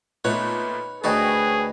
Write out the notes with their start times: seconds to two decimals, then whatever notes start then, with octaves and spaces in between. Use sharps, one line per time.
0.24 A#2 A3 B3 D#4 B4 C#5 F#5
1.04 D2 F#4 G#4 B4 C#5 D#5 G5 A5